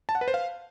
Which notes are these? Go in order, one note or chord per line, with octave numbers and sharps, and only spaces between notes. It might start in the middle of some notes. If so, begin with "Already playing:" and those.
A5
F#5
B4
C5
F5